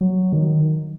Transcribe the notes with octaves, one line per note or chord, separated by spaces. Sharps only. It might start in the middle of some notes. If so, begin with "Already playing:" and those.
F#3
D#3